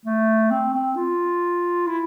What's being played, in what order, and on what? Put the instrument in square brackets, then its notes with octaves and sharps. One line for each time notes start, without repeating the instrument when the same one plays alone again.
[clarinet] A3
C4
C4
F4
E4